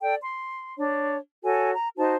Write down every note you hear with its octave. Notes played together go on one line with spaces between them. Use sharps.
A4 D5 G5
C6
D4 C#5
F#4 A4 C#5 G#5
A#5
D#4 F#4 C5 A5